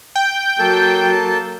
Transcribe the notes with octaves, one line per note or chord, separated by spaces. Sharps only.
G5
F#3 A#3 A4 A5